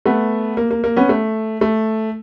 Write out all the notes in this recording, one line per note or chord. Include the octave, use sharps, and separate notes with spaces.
A3 B3
A#3
A#3
A#3
B3 C#4
A3
A3